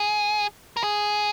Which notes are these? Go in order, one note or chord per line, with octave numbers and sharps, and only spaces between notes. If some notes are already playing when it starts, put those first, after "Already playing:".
Already playing: G#4
A#4
G#4